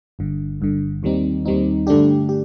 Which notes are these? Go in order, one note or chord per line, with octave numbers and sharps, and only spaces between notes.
G1 G2 D3
G1 G2 D3
D#2 D#3 G3 C4 D#4
D#2 D#3 G3 C4 D#4
G2 D3 A3 D4 G4
G4